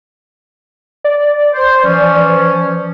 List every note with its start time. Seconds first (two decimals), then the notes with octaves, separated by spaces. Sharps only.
1.04 D5
1.54 C5
1.85 E3 F3 C#4